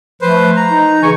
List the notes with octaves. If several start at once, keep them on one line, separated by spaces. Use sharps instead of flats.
F3 A3 B4 C5
A#5
D#4
C#3 E3 G#5 C#6